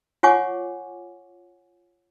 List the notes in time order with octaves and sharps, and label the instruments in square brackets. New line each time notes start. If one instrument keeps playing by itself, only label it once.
[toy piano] F4 C#5 F#5 G#5 C#6 D6